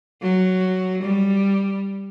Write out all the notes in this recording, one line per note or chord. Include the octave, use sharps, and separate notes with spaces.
F#3
G3